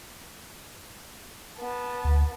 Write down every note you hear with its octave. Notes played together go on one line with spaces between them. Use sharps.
B3 A5
D2